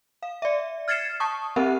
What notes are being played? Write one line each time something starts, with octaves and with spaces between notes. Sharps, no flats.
F5
D5 E5
F6 G#6 A6 C7 C#7 E7
A5 C#6 D#6
C4 G4 A#4 E5 F#5